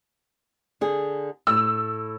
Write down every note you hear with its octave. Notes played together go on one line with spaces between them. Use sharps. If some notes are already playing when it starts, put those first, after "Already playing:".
D3 G#4
A2 E6